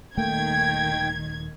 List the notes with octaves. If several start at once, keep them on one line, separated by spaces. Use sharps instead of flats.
D#1 D#3 A3 A#3 G5 G#6